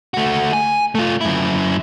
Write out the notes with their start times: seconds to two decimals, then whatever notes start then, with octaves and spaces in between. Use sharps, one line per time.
0.14 A3 F#4
0.53 G#5
0.95 A3 F4
1.21 F#2 E4